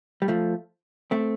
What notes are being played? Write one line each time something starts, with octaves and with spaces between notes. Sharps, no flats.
G3
F3 A3
A3 C4